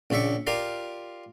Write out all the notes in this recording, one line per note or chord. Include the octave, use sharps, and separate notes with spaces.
A#1 C#3 D5 E5 C#6
F4 G4 A#4 D5 F5